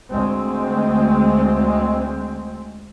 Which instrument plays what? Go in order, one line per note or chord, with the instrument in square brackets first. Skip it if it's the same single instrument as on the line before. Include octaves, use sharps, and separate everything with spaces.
[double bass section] D2 G#3 C4